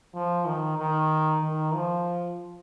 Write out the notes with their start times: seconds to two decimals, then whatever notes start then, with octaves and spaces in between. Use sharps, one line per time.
0.15 F3
0.46 D#3
0.78 D#3
1.42 D#3
1.74 F3